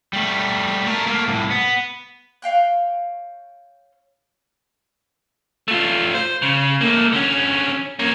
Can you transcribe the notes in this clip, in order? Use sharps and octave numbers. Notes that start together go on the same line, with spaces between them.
G3 A3
A3 A#4
A3 A#3
C2 A2
B3
C#5 F5 G5 F#6
A3 F4
C5
C#3
A3 A#3
D3 C#4
A#3 C#4